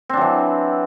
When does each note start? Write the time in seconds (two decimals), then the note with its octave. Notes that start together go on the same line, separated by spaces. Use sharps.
0.09 C4
0.13 D4
0.17 F#3
0.21 E3